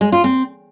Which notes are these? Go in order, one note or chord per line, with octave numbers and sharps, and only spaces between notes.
G#3
F4
C4